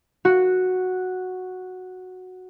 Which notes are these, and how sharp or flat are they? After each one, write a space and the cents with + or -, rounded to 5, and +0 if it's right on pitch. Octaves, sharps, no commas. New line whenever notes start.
F#4 -5